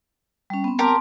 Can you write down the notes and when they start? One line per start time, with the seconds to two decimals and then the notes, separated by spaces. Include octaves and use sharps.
0.50 G3 C#4
0.64 B3 C4
0.79 G4 A#4 A5 C6